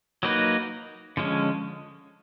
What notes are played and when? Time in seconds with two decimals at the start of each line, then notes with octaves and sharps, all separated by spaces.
0.23 F#3 A#3 D#4 F#4 B4
1.17 D3 F3 G#3 C#4